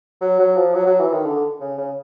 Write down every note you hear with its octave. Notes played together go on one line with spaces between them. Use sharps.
F#3
F#3
F3
F#3
F#3
E3
D#3
D3
C#3
C#3